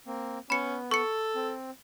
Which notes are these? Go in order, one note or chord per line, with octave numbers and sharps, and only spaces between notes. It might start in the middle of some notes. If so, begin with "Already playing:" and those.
A#3 C4
B3 C#4 B5 C#7
A4 C#6 C#7
C4